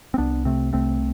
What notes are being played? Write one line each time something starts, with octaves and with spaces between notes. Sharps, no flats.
C4
C2 B3 D4
C3 A3 C4
C2 A3 C4